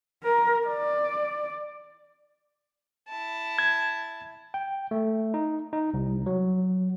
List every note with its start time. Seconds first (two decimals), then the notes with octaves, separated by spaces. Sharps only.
0.23 A#4
0.68 D5
3.08 E4 A5
3.58 G#6
4.54 G5
4.91 A3
5.34 D#4
5.73 D#4
5.94 C2
6.26 F#3